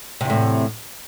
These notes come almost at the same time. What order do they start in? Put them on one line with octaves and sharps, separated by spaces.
C3 E2 A2